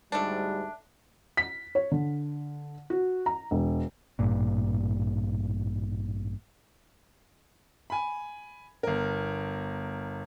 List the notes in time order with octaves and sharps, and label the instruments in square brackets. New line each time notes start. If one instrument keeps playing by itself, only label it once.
[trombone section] D2 G#2 G3 [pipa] A3 D4
[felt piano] B6
C#5
D3
F#4
A#5
E1
[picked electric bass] A1 G2 A#2
[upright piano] G#5 B5
G1 A#4